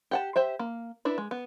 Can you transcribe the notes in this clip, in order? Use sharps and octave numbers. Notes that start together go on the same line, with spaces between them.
G4 F#5 A5
G4 C5 E5
A#3
D4 E4 B4
G#3
B3